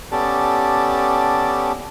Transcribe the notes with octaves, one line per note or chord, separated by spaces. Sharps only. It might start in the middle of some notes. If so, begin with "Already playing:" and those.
B3 C#4 G4 A4 D5 A5